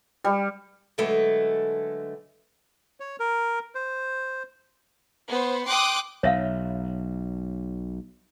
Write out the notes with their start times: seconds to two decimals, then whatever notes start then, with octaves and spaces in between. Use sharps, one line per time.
0.24 G3
0.98 D3 F#3 G#3 A3 A4 B4
3.00 C#5
3.20 A#4
3.75 C5
5.28 B3 C5
5.67 G5 C6 D6 D#6 F#6
6.23 B1 C#5 E5 F5